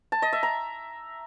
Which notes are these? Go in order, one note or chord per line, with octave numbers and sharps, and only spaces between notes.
A5
D#5
E5
A#5